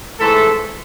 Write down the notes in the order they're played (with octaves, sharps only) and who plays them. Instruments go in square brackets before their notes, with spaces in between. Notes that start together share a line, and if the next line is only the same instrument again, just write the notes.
[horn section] G#2 E3 A3 A4